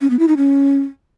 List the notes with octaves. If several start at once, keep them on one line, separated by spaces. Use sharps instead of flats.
C#4
B3
E4
D#4
C#4